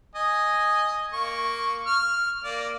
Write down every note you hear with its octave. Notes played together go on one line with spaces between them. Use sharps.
D#5 G#5
A#3 C#6
F6
A#3 D5